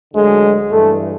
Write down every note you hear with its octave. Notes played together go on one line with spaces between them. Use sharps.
D2 D3 F#3 G#3
G2 E3 A3